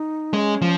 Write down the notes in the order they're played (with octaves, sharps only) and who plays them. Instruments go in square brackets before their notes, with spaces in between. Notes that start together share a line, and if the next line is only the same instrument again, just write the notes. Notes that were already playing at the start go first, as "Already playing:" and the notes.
Already playing: [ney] D#4
[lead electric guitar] G#3 [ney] C#4
[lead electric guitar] F3